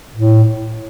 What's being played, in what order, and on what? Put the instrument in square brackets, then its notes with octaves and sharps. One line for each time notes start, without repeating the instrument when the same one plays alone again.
[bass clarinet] A2